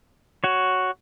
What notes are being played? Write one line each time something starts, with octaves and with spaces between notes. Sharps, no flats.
F#4 C#5